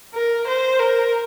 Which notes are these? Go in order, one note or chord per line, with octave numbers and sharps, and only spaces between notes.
A#4
C5
A#4